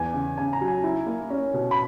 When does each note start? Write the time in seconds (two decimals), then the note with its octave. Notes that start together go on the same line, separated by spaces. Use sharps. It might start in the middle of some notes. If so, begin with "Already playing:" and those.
Already playing: E2 G#5
0.13 C#3
0.38 C#3 G#5
0.53 A#5
0.61 F#3
0.68 G#5
0.83 E4
1.06 A#3
1.30 C#4
1.53 B2
1.71 B5